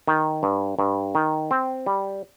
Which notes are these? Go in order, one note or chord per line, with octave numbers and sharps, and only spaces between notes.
D#3
G2
G2
D#3
C4
G3